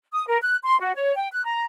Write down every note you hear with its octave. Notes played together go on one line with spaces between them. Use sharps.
D#6
A#4
F#6
C6
F#4
C#5
G5
F#6
A#5